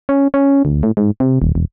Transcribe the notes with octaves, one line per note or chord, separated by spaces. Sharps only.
C#4
C#4
D2
A2
G#2
C3
D#1
E1